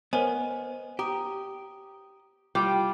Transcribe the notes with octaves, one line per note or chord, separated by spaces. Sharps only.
B3 A#4 C5 C#5 D#5 G#5
G4 A#5 D#6
G3 F4 G5 D6 G6